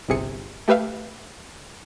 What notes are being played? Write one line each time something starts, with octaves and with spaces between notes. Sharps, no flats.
G1 C2 C3 G#4 C#7
A3 G4 B4 E5 F5